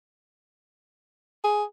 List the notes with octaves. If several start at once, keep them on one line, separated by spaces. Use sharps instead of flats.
G#4